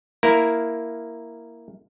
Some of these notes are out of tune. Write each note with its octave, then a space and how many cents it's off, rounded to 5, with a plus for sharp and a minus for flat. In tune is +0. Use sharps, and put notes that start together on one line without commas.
A#3 +0 E4 +0 A#4 +0